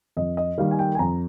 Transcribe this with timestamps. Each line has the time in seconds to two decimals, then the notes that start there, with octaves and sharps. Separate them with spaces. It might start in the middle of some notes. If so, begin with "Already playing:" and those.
0.17 F2 D#5
0.37 D#5
0.58 D#3 G3 A#3 F5
0.71 G#5
0.79 G5
0.95 G#5
0.99 F2 A#5